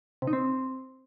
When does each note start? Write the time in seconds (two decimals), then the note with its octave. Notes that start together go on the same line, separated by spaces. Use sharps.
0.22 C3
0.27 D#4
0.33 C4